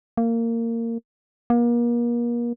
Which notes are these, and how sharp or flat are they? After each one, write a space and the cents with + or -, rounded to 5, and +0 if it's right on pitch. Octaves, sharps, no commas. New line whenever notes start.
A#3 -20
A#3 +35